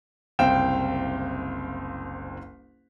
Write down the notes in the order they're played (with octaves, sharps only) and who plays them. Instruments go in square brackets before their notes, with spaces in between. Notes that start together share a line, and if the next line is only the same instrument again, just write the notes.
[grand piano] F#1 C2 C4 F5 G5 E7